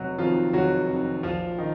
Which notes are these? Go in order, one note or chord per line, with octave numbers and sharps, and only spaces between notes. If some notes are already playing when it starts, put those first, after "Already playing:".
Already playing: F1 F#3 F#4
F2 D#3 F3 F4
F1 F#3 F#4
F2 D#3
A#1 F3 F4
D#3 D#4